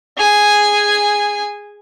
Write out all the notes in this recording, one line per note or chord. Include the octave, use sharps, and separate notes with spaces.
G#4 G#5